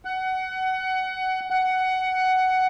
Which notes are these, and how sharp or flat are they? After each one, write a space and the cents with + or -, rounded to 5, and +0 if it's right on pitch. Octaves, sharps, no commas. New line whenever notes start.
F#5 +20
F#5 +15